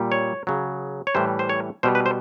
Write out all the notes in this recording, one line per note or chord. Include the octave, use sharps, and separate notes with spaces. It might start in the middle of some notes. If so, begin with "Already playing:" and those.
Already playing: A#2 G3
C#5
C#3 F#3
C#5
A2 E3 G3 C5
C5
C#5
B2 G3 C5
B4
C5